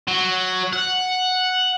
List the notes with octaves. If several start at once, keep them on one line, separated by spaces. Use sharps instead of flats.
F#3
F#5